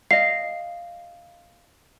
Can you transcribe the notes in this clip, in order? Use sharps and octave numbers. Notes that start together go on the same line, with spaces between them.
D#5 F5 C7